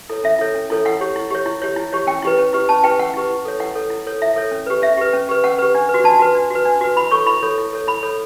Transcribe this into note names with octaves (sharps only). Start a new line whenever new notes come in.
E4 A4 C#5
C#4 E5
E4 A4 C#5
C#4
E4 A4 C#5
E4 F#5
G4 C#5
E4
G4 C#5
E4
G4 C#5
E4
G4 C#5
C#4 G5
E4 G4 B4
C#4
E4 G4 B4
C#4 A5
E4 G4 B4 G5
C#4 F#5
E4 G4 B4
E4
A4 C#5
E4 F#5
A4 C#5
E4
A4 C#5
E4 E5
A4 C#5
C#4
G4 B4
C#4 E5
G4 B4
C#4
G4 B4
C#4 F#5
G4 B4
D4
B4
F#4
D4 A5
F#4 B4
D4
F#4 B4
D4
F#4 B4
E4 B5
A4 C#5 C#6
E4 B5
A4 C#5
E4
A4 C#5
E4 B5
A4 C#5